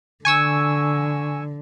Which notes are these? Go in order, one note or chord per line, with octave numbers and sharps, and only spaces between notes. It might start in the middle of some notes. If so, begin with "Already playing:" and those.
D3 G#5 C#6 E6